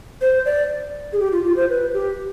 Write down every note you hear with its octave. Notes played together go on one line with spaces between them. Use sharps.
C5
D5
G#4
G4
F4
F4
C5
B4
G4